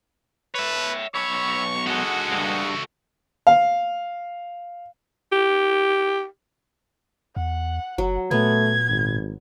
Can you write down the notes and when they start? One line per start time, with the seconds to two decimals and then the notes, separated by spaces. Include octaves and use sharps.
0.55 B4 C#5 E5
1.14 B1 C#5 B5 C#6 E6
1.87 G#3 F#4 A4 F#5 D#6
2.32 G2
3.47 F5
5.32 G4
7.37 E2 F#5
7.98 F#1 F#3
8.31 A#2 A3 B3 G#6
8.88 G#1